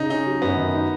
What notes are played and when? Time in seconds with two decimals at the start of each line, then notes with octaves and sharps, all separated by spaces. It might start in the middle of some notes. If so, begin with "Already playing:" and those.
Already playing: C#3 D#4
0.10 C#4 D#4
0.26 F#3
0.42 F#2 B3
0.57 D#3
0.74 D#4